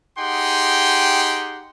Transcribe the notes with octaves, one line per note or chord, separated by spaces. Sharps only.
D#4 G4 G#4 F#5 G5 C6